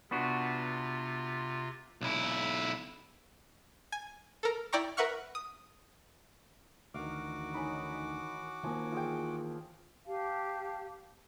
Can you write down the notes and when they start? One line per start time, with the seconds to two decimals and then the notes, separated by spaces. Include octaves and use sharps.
0.11 C3 B3 D4 F4 F#4
2.01 B1 E4
3.92 G#5
4.43 A4 A#4
4.73 E4 D5 G5 A#5 C#6
4.97 A#4 B4 E5 F#5 C#6 F6
5.35 D#6
6.94 D2 D#3 E3 F#4 F5 D6
7.54 C#4 D#4 B5
8.63 D#3 F3 A#3 G#5
8.92 E2 F4 G#4 G5
10.06 G4 F5 A5